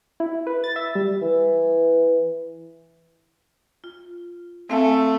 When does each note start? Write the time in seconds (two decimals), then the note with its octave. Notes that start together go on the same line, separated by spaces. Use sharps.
0.20 E4
0.47 B4
0.64 A6
0.76 E5
0.95 G3
1.22 E3
3.84 F4
4.70 A3 C4 F5 G#5